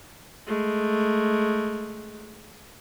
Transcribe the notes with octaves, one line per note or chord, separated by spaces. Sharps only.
G#3 A3